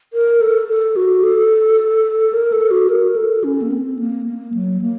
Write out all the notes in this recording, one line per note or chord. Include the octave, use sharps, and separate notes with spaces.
A#4
A4
A4
F#4
A4
A#4
A4
F#4
A#4
A4
C#4
A#3
C4
A#3
A#3
F#3
A#3